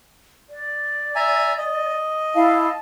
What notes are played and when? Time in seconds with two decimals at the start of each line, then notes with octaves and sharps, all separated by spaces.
0.49 D5
1.16 E5 G#5 A#5
1.58 D#5
2.35 E4 F5 A5